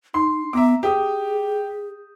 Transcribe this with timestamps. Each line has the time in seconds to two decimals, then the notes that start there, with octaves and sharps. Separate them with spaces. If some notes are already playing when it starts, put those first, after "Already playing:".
0.14 D#4 C6
0.53 B3 E5 A#5 D6
0.83 G4 G#4 D#6